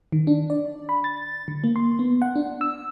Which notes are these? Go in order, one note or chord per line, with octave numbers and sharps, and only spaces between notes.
D#3
D4
D5
B5
A6
D3
A#3
C6
B3
F#5
D4
E6